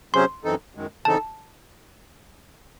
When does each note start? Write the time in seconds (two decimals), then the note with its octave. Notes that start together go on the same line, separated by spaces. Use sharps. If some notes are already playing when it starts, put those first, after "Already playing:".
0.14 C3 F#3 C#4 G#4 C5 C6
0.44 F#2 E3 C4 D#4 A4
0.75 F#2 D#3 G#3
1.05 C#3 E3 C4 D#4 A4 A5